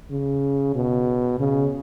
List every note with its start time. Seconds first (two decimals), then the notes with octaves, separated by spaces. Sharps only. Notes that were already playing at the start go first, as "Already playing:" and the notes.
0.12 C#3
0.75 B2
1.40 C#3